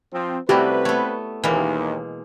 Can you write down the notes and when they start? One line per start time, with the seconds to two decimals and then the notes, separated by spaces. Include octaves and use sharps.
0.13 F3 C4
0.49 C3 G3 A3 C4 E4 F#4 G4 B4
0.85 A3 B3 C#5
1.44 D#2 B2 E3 G#3 A#3